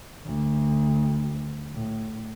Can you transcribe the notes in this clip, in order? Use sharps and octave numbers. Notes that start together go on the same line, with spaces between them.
D2
A2